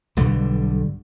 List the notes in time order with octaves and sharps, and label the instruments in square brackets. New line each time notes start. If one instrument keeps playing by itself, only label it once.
[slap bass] B1 G2 D3 G3